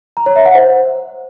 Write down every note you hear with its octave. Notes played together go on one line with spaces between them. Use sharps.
A#5
C#5
E5
F#5
C5